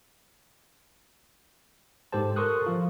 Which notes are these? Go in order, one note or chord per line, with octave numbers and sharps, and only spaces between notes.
G#2 G4 A4 C5 A5
A4 A#4 C6 C#6 D#6 F#6
F3 F4